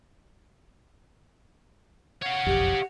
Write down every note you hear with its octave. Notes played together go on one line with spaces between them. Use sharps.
C#5 F5 F#5
F#1 B1 F2 G4